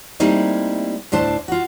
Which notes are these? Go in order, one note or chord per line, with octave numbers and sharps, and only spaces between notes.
G3 A3 A#3 C4 D#4 E4
D2 A2 D4 C5 A5
F4 F#4